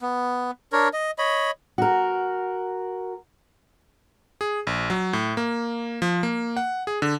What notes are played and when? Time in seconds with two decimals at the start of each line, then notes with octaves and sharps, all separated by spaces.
0.01 B3
0.73 D4 A#4 C#5
0.93 D#5
1.18 C#5 D#5 B5
1.78 F#4 A#4
4.41 G#4
4.67 A#1
4.90 F#3
5.13 A2
5.37 A#3
6.02 F3
6.23 A#3
6.57 F#5
6.87 G#4
7.02 D3